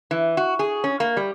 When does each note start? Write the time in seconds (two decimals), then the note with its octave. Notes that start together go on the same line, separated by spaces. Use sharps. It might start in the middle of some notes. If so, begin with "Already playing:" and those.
0.11 E3
0.37 F#4
0.59 G#4
0.84 C#4
1.00 A#3
1.17 G3